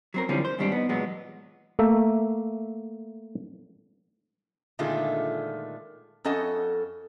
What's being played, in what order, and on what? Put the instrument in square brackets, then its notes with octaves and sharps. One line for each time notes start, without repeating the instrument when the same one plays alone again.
[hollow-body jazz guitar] F#3 C4 A#4
D3 E3 F3 G3 C4 C#4
C5
G#2 D#3 G3 C4 D4
B3 D#4
E2 A#2 F#3 G#3 B3
[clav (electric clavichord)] A3 A#3 E5
[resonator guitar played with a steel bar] A#2 D3 D#3 G#3 A3 F4
F2 C#4 A4 D#5 F#5